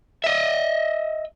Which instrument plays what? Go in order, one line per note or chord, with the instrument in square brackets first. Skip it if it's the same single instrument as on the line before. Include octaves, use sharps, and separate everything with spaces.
[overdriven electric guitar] D#5 E5